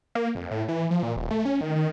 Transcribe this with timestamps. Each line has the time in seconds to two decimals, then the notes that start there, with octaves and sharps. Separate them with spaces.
0.15 A#3
0.35 F2
0.51 A2
0.68 E3
0.91 F3
1.03 A#2
1.16 D#1
1.31 A3
1.45 C#4
1.61 D#3
1.76 D#3